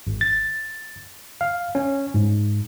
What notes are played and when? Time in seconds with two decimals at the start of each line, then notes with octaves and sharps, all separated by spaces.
0.07 G#1
0.21 A6
1.41 F5
1.75 C#4
2.14 G#2